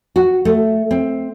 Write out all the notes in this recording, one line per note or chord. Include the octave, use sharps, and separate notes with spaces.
F#4
A3
C4